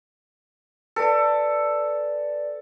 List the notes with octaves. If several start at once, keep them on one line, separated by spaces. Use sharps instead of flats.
A4 B4 D5